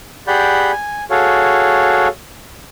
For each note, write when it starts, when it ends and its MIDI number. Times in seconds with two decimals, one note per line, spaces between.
0.28 0.72 67
0.28 0.72 68
0.28 0.72 74
0.28 0.72 78
0.28 0.72 83
0.28 0.72 91
0.72 1.04 80
1.10 2.08 66
1.10 2.08 68
1.10 2.08 69
1.10 2.08 73
1.10 2.08 77